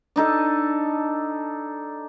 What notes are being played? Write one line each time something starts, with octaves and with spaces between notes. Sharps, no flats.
D4 D#4 A4